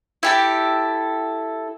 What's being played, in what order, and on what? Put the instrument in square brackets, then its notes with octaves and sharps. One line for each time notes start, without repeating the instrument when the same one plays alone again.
[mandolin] E4 G4 A4